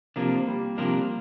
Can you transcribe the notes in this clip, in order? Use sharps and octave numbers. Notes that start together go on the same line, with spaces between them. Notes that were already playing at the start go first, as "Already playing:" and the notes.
C3 F3 A#3 D4
G3
C3 F3 A#3 D4 A#4